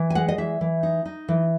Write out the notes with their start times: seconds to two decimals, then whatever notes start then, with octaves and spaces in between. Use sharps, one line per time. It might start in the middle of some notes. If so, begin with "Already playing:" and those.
Already playing: E3
0.10 G#5
0.15 G#3 F#5
0.28 D#5
0.38 E3 E5
0.61 E3
0.83 D#4
1.05 D#4
1.28 E3